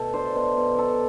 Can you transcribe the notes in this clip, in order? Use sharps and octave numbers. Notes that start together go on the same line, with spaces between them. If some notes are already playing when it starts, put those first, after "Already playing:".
Already playing: B2 A3 A4
D4 C5
B2 C5
B2
F#3 A4